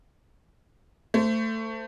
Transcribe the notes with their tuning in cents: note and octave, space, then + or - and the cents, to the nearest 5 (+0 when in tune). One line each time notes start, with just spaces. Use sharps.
A3 +20 C5 -20